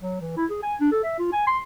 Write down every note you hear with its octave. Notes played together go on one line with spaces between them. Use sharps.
F#3
E3
E4
G#4
G#5
D4
A4
E5
F4
G#5
C6